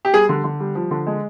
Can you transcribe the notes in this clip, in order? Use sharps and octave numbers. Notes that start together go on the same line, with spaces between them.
G4
G3 G#4
D3
D3
G3
F3
D3
G#3